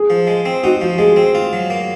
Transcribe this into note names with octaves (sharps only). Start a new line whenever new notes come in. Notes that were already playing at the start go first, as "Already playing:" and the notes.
Already playing: G#4
F3
G#3
C4
D#4 F#4
F3 F#4
G#3 G#4
C4
F4
F#3
A#3